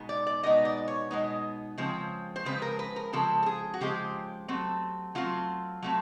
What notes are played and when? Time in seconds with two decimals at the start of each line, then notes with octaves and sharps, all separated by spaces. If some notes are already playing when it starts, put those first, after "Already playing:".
Already playing: B2 G#3 B3 D#4
0.09 D5
0.27 D5
0.43 B2 G#3 B3 D#4 D#5
0.65 D5
0.88 C#5
1.11 B2 G#3 B3 D#4
1.78 C#3 F3 G#3 C4
2.36 C5
2.45 C#3 F3 G#3 C4 B4
2.62 A#4
2.79 B4
2.96 A#4
3.13 C#3 F3 G#3 C4 A4
3.43 A4
3.46 G#4
3.74 F#4
3.80 C#3 F3 G#3 C4 G4
4.48 F#3 A3 C4
5.15 F#3 A3 C4 F4
5.83 F#3 A3 C4